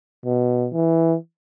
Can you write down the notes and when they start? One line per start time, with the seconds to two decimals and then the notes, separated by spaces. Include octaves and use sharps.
0.25 B2
0.73 E3